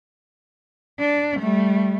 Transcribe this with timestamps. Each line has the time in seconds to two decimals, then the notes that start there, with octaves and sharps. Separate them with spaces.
1.00 D4
1.40 G3 A3